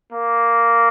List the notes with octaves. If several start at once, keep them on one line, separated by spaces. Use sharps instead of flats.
A#3